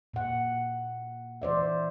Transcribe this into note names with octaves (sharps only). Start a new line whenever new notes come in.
A#2 F#5
E3 C5 D5 E5